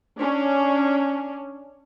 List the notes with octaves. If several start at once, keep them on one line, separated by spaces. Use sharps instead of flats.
C#4 D4